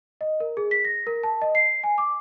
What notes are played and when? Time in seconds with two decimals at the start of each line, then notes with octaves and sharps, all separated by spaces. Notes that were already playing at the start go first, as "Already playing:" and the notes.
0.21 D#5
0.40 A#4
0.57 G#4
0.71 B6
0.85 A#6
1.07 A#4
1.23 A5
1.42 D#5
1.55 C7
1.83 G#5
1.98 D6